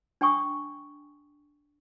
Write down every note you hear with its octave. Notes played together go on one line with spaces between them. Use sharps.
D4 G5 G#5 C#6 D#6